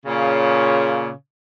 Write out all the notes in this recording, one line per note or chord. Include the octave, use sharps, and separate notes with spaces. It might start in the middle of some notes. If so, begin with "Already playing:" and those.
A#2 C#3